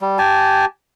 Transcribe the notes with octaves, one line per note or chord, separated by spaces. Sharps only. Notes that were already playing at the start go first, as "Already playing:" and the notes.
G3
G4 G#5 A5